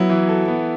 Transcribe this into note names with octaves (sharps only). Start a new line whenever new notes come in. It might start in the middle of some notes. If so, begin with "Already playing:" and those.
Already playing: F#3 B3 E4
E3
A4
B3